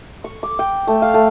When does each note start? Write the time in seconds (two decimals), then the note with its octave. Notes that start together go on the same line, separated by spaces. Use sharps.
0.24 C#6
0.43 D6
0.59 G5
0.87 A3
1.02 F5
1.14 A3